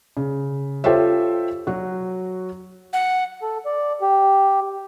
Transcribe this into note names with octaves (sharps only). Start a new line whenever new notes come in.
C#3
F4 G4 A4 C5 C#5 E5
F#3 F#4
F#5
A4
D5
G4